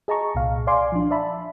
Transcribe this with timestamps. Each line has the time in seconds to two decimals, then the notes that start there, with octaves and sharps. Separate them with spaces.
0.08 G#4 D#5 A5 A#5 C#6
0.35 C2 A#2 F5
0.67 D5 F5 G#5 C6 D6
0.92 F3 D4
1.11 D5 E5 A5 B5